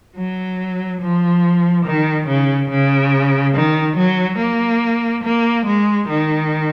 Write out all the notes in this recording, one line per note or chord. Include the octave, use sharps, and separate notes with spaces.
F#3
F3
D#3
C#3
C#3
D#3
F#3
A#3
A#3
G#3
D#3